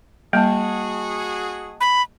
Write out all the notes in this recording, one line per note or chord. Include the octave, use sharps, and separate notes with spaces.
G3 A#3 F#4 G#4 D#5 G5 A5
B5